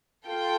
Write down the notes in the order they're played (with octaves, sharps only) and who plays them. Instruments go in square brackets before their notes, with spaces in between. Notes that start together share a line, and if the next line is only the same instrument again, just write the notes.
[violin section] F4 A4 G5